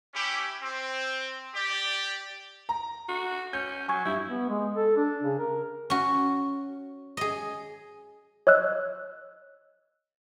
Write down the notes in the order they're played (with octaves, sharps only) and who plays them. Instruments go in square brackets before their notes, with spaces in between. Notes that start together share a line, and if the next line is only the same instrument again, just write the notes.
[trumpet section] C#4 E4 G4
C4
G4 D5
[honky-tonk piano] A#5
[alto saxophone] F#4
[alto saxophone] C#4 [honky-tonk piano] G6
[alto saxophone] F#3 [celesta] G#5 C#6 G#6
[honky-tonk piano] G2 [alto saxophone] E4 [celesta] G6
[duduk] B3
G#3
A4
D4
C#3
A#4
[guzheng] C#4 F#4
G#4 D#5
[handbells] C#5 D#5 E6 F#6